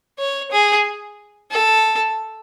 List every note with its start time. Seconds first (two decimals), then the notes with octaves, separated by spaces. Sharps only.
0.19 C#5
0.51 G#4
1.51 A4